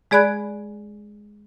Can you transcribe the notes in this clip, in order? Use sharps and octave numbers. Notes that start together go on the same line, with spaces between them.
G#3 G#4 D5 B5 F#6 G#6